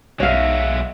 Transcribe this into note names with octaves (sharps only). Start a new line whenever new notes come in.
B1 G#3 F#4 C#5 E5 F5